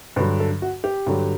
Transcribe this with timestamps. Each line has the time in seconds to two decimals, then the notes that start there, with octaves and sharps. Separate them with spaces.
0.16 G2 D3 F#3 B4
0.40 A4
0.62 F#4
0.84 G4
1.06 G2 D3 F#3